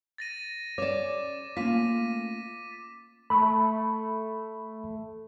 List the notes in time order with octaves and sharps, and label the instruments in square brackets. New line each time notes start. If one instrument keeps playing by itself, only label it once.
[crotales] A6 A#6 D#7
[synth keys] C#4 [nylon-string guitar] C#5 D5 [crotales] D6 E7
[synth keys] A3 A#3 C#4 [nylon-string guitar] F4 [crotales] B6 D#7
[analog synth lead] A3 [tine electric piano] B5